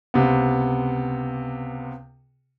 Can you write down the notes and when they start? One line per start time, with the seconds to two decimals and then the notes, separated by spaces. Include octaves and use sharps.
0.14 C#2 C3 B3